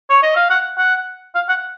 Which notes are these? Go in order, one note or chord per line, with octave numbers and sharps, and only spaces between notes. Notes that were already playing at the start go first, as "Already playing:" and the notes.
C#5
D#5
F5
F#5
F#5
F5
F#5